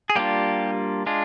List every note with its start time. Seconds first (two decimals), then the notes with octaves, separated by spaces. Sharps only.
0.10 G#4
0.16 G3 A#3 D4 F4 G4
1.06 G#3 D4 F4